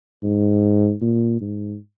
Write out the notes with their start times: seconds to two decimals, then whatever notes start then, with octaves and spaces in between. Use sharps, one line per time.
0.23 G#2
1.02 A#2
1.41 G#2